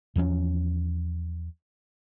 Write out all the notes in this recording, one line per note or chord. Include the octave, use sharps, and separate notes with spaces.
E2 F3 F#3 C#4